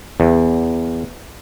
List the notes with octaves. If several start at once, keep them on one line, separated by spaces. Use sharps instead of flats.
E2